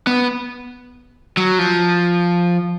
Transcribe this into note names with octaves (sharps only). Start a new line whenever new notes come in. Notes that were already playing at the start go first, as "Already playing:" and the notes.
B3
F#3
F3